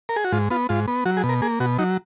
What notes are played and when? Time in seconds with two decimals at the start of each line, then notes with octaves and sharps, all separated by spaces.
0.09 A#4
0.16 G#4
0.24 F#4
0.32 G#2 F4
0.50 B3 F4
0.69 G#2 F4
0.88 B3
1.05 F#3 F#4
1.17 G#4
1.24 B2
1.29 A#4
1.42 A#3 G#4
1.60 B2 F#4
1.78 F#3 D#4